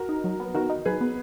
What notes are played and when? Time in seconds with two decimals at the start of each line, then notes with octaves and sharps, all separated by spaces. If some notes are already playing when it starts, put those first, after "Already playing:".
Already playing: F#4 A#4
0.09 D#4
0.24 F#3
0.40 B3
0.54 D#3 F#4 A#4
0.70 D#4
0.85 F#3 G#4 B4
1.01 B3